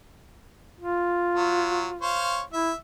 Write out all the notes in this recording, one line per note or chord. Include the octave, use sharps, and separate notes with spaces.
F4
F#3
C5 C#5 F5
E4 E5